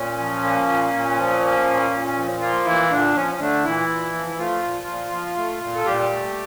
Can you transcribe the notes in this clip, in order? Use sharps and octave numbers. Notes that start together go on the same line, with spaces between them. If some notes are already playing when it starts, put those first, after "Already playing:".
Already playing: A#2 C#4
F3
A#3
A#2
A#2
F3
A#3
A#2
A#2
F3
F3 A#3 F4
A#2 E3 E4
A#2 D3 D4
F3 C#4
C#4
D3 A3 D4
A#2 E3 E4
A#2
F3
E4
F3 A3 F4
A#2
A#2
F3
A3
A#2
A4
A#2 G3 G4
A3